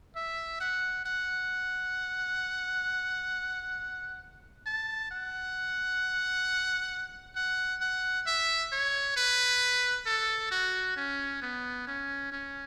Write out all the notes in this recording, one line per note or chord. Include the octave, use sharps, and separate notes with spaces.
E5
F#5
F#5
A5
F#5
F#5
F#5
E5
C#5
B4
A4
F#4
C#4
B3
C#4
C#4